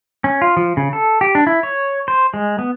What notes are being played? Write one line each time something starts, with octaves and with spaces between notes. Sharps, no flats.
C#4
F4
F3
C#3
A4
G4
D4
E4
C#5
C5
G#3
B3